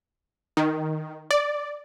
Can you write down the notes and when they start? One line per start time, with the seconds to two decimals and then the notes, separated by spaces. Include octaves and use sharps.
0.57 D#3
1.31 D5